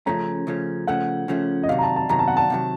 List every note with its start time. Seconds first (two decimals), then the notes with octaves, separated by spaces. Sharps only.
0.06 C#3 F3 A3 C#4 A#5
0.47 C#3 F3 A3 C#4
0.87 C#3 F3 A3 C#4 F#5
1.28 C#3 F3 A3 C#4
1.63 D#5
1.69 C3 D#3 F#3 F5
1.79 A#5
1.83 A5
1.96 A5
2.09 C3 D#3 F#3 A#5
2.19 A5
2.28 F#5
2.37 A5
2.50 C3 D#3 F#3